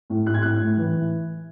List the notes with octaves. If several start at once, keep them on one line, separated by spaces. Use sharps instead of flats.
A2
A2 F#6
G#6
A2 F#6
A2
E3